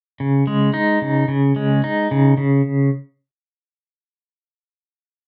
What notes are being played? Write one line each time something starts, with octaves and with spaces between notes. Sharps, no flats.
C#3
G#3
D#4
C#3
C#3
G#3
D#4
C#3
C#3